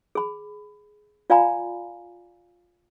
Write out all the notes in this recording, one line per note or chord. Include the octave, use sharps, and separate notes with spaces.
G#4 B5
F4 D5 F5 G#5 A#5 B5